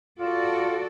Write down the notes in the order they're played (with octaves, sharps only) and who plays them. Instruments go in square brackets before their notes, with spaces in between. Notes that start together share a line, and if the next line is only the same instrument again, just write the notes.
[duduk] F4 [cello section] F#4 A4 D5